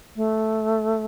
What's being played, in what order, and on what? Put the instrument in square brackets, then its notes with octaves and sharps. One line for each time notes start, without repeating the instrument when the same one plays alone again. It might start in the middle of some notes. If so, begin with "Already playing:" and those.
[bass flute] A3